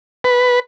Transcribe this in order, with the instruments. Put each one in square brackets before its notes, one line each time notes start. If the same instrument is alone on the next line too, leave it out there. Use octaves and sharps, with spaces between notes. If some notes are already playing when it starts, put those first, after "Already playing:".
[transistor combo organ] B4